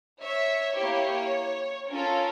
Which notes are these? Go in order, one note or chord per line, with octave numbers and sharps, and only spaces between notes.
C#5 E5
A#3 E4 G4 C#5
C#4 F4 A4 A#4